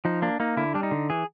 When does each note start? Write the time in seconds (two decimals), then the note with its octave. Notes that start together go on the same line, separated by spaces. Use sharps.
0.05 F3 D#4
0.22 A#3 D4
0.40 A#3 D#4
0.57 D3 E4
0.74 G3 D4
0.83 D#4
0.91 D3
1.10 E3 G#4